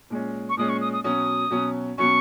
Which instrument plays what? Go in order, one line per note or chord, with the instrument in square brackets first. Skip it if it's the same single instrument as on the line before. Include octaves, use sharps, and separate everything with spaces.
[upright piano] A#2 G#3 C#4
[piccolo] C#6
[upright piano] A#2 G#3 C#4 [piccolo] D#6
[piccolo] C#6
D#6
D#6
[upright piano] B2 F#3 C#4 [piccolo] D#6
[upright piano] B2 F#3 C#4
[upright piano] B2 F#3 C#4 [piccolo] C#6